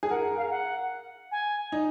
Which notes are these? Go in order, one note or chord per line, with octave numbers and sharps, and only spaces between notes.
G#4
A#4 F#5
F5
F#5
G#5
D#4